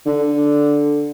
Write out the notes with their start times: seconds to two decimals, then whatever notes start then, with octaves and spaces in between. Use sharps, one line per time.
0.06 D3